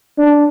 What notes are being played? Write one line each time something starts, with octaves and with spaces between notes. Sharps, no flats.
D4